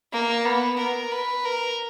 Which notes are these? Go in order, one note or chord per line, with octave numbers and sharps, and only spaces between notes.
A#3
B3
A#4
B4
A#4